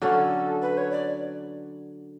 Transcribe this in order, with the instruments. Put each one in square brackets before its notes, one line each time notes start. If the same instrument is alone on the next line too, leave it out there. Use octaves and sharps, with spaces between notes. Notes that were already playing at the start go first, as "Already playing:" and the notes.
[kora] D3 F#3 C#4 [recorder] A4
[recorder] B4
C#5
D5